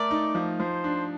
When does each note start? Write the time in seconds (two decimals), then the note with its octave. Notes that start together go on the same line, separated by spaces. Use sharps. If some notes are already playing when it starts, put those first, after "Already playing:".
Already playing: A3 A#4 D5
0.11 D#4
0.35 F3
0.60 F3 C5
0.84 D4